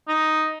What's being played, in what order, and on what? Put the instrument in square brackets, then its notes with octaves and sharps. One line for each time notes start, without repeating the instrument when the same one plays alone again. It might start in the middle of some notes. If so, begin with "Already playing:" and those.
[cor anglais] D#4